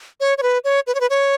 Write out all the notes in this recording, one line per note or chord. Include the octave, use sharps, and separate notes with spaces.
C#5
C#5
B4
C#5
B4
C#5
B4
C#5